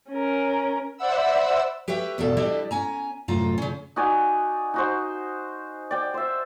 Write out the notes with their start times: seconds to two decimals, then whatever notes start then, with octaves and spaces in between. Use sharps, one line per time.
0.10 C#4 A#4
0.97 C5 D5 E5 F#5 B5 E6
1.88 G4 B4 C#5 E5 G5
2.18 E2 G2 B2 A4
2.37 G3 D4 E4 G4 A4 D#5
2.71 C#4 G#5 A#5
3.28 F#2 A2 C3 F4 A#5
3.58 C#3 C#4
3.96 D#4 F#4 D5 G#5
4.74 D#4 F#4 C5
5.91 D5 G5
6.14 C5 E5